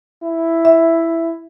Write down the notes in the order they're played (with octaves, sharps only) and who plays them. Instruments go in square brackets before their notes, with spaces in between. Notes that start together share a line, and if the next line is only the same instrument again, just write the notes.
[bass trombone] E4
[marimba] E5